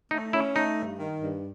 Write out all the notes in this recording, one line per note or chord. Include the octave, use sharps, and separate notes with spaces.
A3 D#4
C#4 E4
A3 D#4
G2
D#3
G2